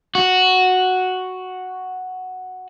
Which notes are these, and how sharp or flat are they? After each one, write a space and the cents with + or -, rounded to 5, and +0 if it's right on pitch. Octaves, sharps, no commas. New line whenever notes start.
F#4 +0